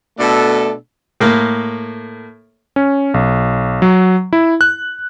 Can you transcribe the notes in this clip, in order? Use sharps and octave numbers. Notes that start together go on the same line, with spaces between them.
B2 A3 D4 A4
A2 A#3
C#4
B1
F#3
E4
F#6